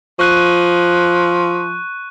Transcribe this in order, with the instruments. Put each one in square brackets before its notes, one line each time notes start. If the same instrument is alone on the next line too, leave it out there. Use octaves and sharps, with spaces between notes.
[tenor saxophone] F3 [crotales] C#6 F#6 D#7